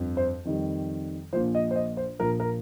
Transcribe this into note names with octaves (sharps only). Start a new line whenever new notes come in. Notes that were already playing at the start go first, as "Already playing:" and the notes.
Already playing: G1 F2 F3
C5
F2 D#3 G3
A#1 A#2 F3 C5
D#5
C5
D#5
C5
A#1 A#2 F3 A#4
A#4